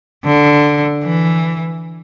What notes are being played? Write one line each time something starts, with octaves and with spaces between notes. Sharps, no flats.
D3
E3